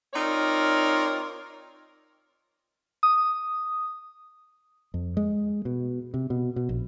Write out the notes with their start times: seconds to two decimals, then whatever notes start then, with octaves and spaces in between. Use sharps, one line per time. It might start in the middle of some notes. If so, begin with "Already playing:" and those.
0.14 C4 D#4 F4 A#4 C#5 D5
3.03 D#6
4.94 F2
5.17 G#3
5.65 B2
6.14 C3
6.30 B2
6.56 B2
6.69 A#1